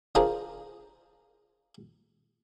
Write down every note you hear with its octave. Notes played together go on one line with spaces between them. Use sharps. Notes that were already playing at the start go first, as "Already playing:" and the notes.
D4 F4 G#4 A#4 C5 D5